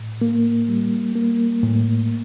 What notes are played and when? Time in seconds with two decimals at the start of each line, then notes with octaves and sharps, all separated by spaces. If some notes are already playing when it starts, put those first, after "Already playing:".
Already playing: A2
0.21 A#3
0.69 G3
1.15 A#3
1.63 A2